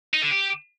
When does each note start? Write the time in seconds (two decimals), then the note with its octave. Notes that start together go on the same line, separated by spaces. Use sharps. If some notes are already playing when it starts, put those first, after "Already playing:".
0.14 D#4
0.23 D3
0.32 G4